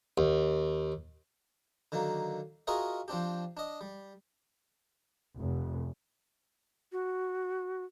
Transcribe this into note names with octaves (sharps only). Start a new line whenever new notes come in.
D#2
D3 D#3 F#3 A#3
F4 F#4 G#4 A#4 D#5 E5
F3 C4 D4 G4
D4 D#5
G3
F1
F#4